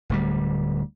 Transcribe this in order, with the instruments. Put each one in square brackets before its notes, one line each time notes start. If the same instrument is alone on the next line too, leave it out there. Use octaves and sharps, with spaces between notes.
[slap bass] D1 D2 G3